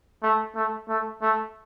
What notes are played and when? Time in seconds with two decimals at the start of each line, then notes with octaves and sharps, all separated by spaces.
0.23 A3
0.55 A3
0.89 A3
1.21 A3